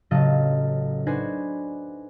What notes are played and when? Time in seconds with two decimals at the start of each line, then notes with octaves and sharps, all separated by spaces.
0.11 A1 C#3 F#3 D#5 F5 A5
1.06 D4 D#4 F#4 B4 C5 G#5